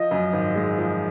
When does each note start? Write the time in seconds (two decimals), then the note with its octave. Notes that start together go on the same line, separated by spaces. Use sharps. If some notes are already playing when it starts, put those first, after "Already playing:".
Already playing: F3 D#5
0.11 F#2
0.33 G#1
0.55 G#3
0.78 F3